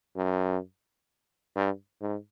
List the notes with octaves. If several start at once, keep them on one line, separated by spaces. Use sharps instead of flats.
F#2
G2
G#2